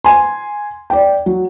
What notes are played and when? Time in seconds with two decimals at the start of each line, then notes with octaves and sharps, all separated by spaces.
0.04 G#5 C6
0.90 D5 G5
1.26 F#3